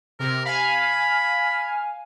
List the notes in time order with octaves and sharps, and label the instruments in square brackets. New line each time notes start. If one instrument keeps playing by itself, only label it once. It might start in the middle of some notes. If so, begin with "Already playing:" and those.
[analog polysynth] C3 [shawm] A#4
[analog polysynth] F5 G#5 [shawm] B5